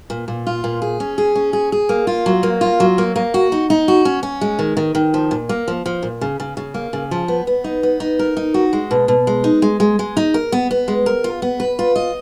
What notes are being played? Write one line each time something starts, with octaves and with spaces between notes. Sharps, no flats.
A#2
A#2
F4
A#2
G#4
C#4
G#4
C#4
G#4
G#4
A#3
F4
F#3
A#3
F4
F#3
A#3
A#3
F#4
D#4
D#4
F#4
C#4
C#4
G#3
D#3
D#3
D#3
F3
A#2
A#3
F3
F3
A#2
C#3
C#3
C#3
A#3
C#3
F3
B3
B3
D#4
B3
D#4
A#4
D#4
F#4
G#3
B2
B2
G#3
D#4
G#3
G#3
G#3
D#4
A#4
B3
B3
G#3
A#4
F4
B3
B4
F4
D#5